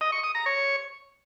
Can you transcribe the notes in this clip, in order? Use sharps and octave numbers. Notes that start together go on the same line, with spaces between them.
D#5
C#6
D#6
A#5
C#5